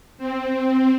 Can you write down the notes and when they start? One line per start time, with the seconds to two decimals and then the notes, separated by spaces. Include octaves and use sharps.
0.18 C4